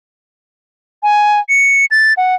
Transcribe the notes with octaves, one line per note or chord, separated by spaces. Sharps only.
G#5
C#7
A6
F#5